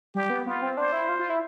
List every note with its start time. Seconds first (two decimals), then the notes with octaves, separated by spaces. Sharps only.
0.15 G3 G4
0.30 B3
0.46 B3 F4
0.62 C4
0.77 D4 C5
0.93 E4
1.09 F4
1.19 F4
1.30 E4